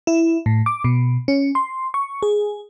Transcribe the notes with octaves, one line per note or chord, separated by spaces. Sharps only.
E4
A2
D6
B2
C#4
C6
C#6
G#4